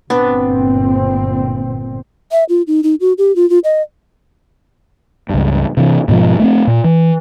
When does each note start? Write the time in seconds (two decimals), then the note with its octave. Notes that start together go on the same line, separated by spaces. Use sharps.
0.10 G1 A#2 B3 C4 D4
2.32 E5
2.49 F4
2.67 D#4
2.83 D#4
3.00 F#4
3.18 G4
3.36 F4
3.50 F4
3.64 D#5
5.29 C#2 G2
5.77 C3 E3
6.08 G#2 B2 E3 F3
6.40 A3 A#3 C4
6.67 A#2
6.84 E3